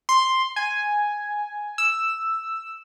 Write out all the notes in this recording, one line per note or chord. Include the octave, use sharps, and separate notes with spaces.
C6
G#5
E6